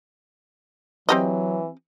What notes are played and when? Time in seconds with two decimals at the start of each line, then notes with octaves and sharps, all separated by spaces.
1.09 E3 F#3 C4 G4 D#5